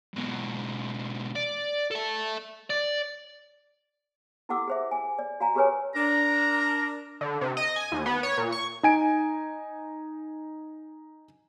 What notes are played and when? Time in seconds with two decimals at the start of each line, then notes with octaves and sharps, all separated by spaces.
0.14 G#2 B2
1.36 D5
1.91 A4 E5
2.70 D5
4.49 E4 G4 A4 F#5 D6 E6
4.68 G#4 C5 E5
4.91 G#5
5.19 D5
5.40 F#4 F5 G#5 A#5
5.55 G4 G#4 A#4 B4 C#5 G#5
5.95 D4 A#4 A#5
7.21 D3
7.41 C3
7.57 D#5
7.76 G#5
7.92 D#2
8.06 B3
8.23 C#5
8.37 A#2
8.52 C#6
8.83 D#4 G#5 D7